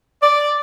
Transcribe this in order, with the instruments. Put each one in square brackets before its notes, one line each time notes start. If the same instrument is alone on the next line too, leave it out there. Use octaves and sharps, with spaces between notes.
[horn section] D5